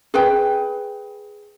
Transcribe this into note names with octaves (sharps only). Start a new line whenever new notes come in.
G#4 B4 G5